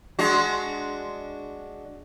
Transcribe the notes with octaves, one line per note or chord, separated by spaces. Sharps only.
G#3 D4 F#4